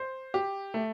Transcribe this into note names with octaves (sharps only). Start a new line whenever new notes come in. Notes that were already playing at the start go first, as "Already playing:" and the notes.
Already playing: C5
G4
A3